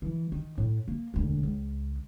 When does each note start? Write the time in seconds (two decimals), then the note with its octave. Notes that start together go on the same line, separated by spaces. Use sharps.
0.02 E3
0.32 D#3
0.58 A2
0.88 A#3
1.14 E1 D2
1.43 C#2